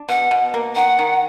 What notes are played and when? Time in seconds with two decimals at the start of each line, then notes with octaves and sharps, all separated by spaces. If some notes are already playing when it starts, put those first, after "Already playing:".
Already playing: D4
0.09 B2 F#5
0.31 B2
0.54 A#3
0.76 D#3 F#5
0.99 D#3